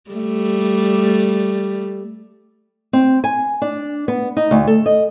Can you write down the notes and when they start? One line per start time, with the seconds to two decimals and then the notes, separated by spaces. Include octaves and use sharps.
0.11 G3 A3
2.93 C4
3.24 G#5
3.62 D4
4.08 B3
4.37 D#4
4.51 D2
4.67 A4
4.86 D#5